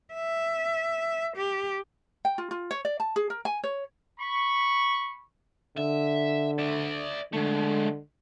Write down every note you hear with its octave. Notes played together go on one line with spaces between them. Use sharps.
E5
G4
G5
F4
F4
C#5
D5
A5
G#4
A#4
G#5
C#5
B5 C#6
D3 E5
D5 E5
D3 G#3 A3